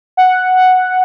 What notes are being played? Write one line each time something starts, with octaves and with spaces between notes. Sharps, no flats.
F#5